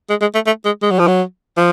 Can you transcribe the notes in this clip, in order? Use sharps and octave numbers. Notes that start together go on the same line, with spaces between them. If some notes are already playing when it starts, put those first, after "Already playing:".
G#3
G#3
A3
A3
G#3
G#3
F#3
F3
F#3
F3